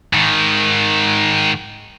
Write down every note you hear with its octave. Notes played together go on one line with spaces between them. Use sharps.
G#2 D#3